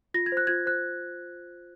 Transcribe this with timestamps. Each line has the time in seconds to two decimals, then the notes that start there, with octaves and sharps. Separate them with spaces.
0.14 F4 A#6
0.26 G#6
0.32 C5 F#6
0.47 F4 G#6
0.66 C5 F#6